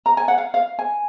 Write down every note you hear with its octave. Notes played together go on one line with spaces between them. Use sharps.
A#5
G#5
F#5
F5
F5
G#5